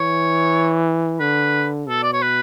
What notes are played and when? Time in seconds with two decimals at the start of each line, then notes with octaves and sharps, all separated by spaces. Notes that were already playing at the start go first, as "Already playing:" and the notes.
Already playing: E3 C#5
1.20 D3 B4
1.89 B2 A4
2.03 D5
2.13 C#5
2.22 B4